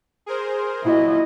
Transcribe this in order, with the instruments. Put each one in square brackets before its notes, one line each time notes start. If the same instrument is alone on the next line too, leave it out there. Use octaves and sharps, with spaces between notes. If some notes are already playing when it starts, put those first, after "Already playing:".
[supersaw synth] G#4 A#4 C5
[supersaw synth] A#2 F#3 [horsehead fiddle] E4 D#5